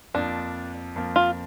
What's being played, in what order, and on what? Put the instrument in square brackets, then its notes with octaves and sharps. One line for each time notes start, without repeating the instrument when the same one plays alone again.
[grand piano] F2 F3 A#3 [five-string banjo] D4
[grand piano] F2 F3 A#3
[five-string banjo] F4